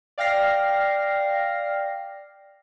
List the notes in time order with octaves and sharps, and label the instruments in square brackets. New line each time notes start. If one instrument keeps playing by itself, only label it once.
[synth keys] D5 F5 G5 F6 A#6 C7